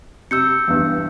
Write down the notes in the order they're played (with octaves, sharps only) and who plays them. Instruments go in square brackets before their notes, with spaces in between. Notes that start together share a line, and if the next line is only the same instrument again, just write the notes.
[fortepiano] C3 [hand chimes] E6 G6 C#7
[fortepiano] E2 G2